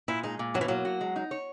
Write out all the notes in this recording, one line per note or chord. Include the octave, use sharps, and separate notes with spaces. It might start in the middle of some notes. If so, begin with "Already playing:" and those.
A#2 E4
G#3 D#4
A#2
B2 F#3
E3
F#3 A#3
F#4
G#3
D#4
C#5